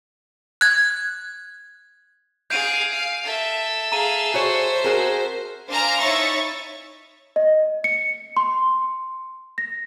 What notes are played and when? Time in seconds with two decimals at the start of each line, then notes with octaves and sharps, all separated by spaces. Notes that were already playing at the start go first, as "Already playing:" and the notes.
0.61 F#6 G#6
2.50 G#4 F5 G6 D7 D#7
2.93 F5
3.24 A4 E5
3.92 G#4 F5 A#5 D#7
4.34 F#4 G#4 C5 C#5
4.84 F#4 G#4 A#4
5.69 D4 C5 F5 G#5 A#5 F6
5.99 D#4 E4 C#5 E5 C#6 A6
7.36 D#5
7.84 C#7
8.37 C6
9.58 A#6